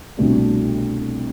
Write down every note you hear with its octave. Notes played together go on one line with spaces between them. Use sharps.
C2 B2 A3 D4